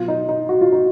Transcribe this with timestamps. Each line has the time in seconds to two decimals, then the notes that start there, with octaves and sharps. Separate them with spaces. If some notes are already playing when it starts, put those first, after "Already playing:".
Already playing: B2 F#3 F4
0.08 D#4
0.29 D#4
0.49 F#4
0.61 F4
0.72 D#4